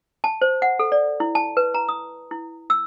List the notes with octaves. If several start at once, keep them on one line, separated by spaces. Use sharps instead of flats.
A5
C5
F#5
A4
D5
E4
A5
B4
A#5
D#6
E4
E6